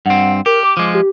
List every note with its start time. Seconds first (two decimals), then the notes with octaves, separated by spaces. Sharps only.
0.06 G2 C4 F#5
0.46 G4 A#4
0.63 D6
0.77 F3 G#3
0.94 G4